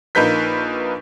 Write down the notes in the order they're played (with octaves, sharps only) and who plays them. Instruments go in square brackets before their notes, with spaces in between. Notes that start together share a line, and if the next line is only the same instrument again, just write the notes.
[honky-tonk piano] A#1 A#3 D#4 B4 G6 B6